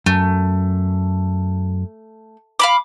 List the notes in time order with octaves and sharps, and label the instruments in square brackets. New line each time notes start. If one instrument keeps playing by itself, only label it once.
[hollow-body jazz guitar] F#2 [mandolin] A3
[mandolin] F5 B5 D6